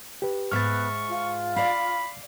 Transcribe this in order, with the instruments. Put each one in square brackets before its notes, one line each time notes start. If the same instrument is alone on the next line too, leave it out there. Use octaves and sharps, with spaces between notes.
[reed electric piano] G4 B4
[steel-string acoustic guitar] G#2 E5 [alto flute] B3 [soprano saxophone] C#6 [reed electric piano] F6 A6
[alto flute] F4
[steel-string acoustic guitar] D5 F5 [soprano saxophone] B5